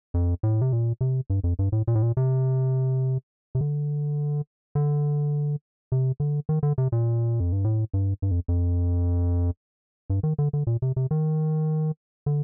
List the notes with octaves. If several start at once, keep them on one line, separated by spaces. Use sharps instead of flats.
F2
A2
C3
A#2
C3
G2
F2
G2
A2
A#2
A2
A#2
C3
C3
D3
D3
C3
D3
D#3
D3
C3
A#2
F2
G2
A2
G2
G2
F2
F2
G2
D#3
D3
D3
A#2
C3
C3
D#3
D3